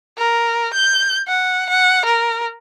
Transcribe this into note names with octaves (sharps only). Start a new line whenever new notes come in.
A#4
G6
F#5
F#5
A#4